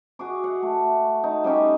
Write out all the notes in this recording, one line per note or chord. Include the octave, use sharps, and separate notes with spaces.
F#4 G#4 D6
F#5
A3
D#4
G3 C#4 D#4 G4